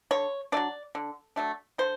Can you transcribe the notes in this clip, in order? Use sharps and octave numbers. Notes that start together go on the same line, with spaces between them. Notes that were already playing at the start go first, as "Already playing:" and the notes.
D3 C#5
F#3 A3 D4 D5
D3
F#3 A3 D4
D3 C5